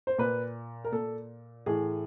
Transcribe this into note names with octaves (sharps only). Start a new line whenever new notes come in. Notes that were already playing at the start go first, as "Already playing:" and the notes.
C5
A#2 B4
A#4
A#2 A4
A2 E3 G#4